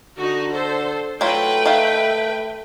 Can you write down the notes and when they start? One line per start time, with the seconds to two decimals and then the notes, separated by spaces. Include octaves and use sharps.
0.19 D3 D#4 F#4
0.52 A4 C5
1.21 F#3 A3 E4 F4 B4 G5
1.66 D#3 E5 F5